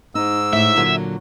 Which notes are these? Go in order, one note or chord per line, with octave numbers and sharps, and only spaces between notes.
G#2 D#4 E6
A2 E5
A#2 D3 F#3